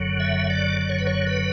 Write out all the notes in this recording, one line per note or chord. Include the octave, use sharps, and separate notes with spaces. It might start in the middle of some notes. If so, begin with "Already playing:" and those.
Already playing: F#1 F#2 D3 F#3
E5
D5
D5
C#5
B4
C#5
B4